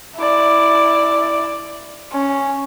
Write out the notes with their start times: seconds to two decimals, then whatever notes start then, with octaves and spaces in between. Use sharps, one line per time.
0.17 E4 D5
2.12 C#4